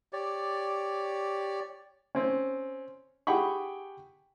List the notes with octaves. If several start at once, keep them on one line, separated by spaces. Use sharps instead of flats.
G4 C#5 D5
C4 C#4
G4 G#4 F#5 G5 B5 C#6